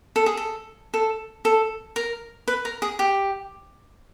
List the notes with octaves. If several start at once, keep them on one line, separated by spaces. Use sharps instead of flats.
A4
G#4
A4
A4
A4
A#4
B4
A#4
G#4
G4